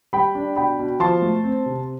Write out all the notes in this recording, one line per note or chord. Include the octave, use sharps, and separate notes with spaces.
G3 G5 B5
D4
B2 G5 B5
B2
F3 A5 C6
A3
C4
C3